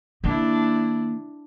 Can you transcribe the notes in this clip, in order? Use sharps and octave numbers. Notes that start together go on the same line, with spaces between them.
D#3 A#3 D4 E4